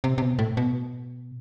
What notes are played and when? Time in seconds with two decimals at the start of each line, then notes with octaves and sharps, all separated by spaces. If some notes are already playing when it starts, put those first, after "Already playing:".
0.04 C3
0.18 C3
0.22 B2
0.39 A2
0.57 B2